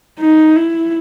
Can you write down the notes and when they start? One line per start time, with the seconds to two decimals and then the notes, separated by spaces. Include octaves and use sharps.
0.20 D#4
0.56 E4